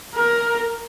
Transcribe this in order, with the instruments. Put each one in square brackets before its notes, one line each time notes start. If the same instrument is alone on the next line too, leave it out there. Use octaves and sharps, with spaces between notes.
[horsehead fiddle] A#4